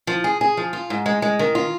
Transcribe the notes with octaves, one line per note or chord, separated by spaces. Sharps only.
F3
G#4
G#4
F3
F4
G#2
G#3
G#3
D#3
F4